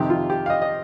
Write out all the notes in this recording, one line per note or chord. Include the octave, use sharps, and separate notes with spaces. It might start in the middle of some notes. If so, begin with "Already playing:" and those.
Already playing: F2 C3 D#3 G4
F4
G4
F5
D#5
D#5